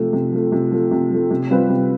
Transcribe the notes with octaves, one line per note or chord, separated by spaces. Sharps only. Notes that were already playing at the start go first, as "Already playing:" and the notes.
Already playing: C3 F3 A3
C3
F3 A3
C3
F3 A3
C3
F3 A3
C3
G3 C4 F4 B4
C3